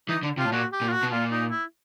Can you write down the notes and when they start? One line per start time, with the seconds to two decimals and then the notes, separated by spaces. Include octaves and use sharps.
0.09 E3 D#4
0.23 D3
0.37 C3 F4
0.45 A2
0.52 A#2 F#4
0.72 G4
0.81 A#2
0.88 F4
0.92 F#4
1.03 B2
1.11 A#2 F4
1.31 D#4
1.50 E4